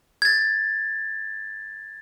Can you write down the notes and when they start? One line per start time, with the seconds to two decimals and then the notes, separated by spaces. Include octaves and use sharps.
0.22 G#6 A6